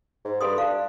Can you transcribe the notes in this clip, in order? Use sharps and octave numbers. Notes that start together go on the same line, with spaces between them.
G#2
G2 A4 C6 D#6
D4 F5